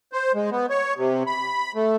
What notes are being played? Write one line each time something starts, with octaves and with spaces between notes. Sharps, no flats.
C5
G#3
B3
C#5
C3
B5
A3